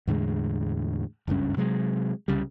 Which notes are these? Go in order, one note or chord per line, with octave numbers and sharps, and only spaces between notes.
E2 A2 D3 G#3
F#1 C#2 G2 C#4
C3 F#3 G#3
C2 C#3 G3